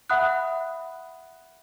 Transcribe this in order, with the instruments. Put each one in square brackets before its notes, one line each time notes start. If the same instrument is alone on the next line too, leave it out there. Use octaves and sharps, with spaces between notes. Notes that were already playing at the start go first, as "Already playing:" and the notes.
[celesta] E5 F#5 B5 D#6 F#6